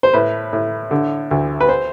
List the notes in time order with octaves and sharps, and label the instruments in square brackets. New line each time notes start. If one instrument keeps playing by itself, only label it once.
[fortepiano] C5
A2 B4
A2
D3
D2
B4
C5